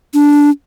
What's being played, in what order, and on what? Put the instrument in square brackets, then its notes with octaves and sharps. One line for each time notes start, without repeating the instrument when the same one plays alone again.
[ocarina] D4